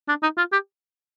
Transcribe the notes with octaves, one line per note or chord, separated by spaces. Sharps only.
D4
D#4
F4
G4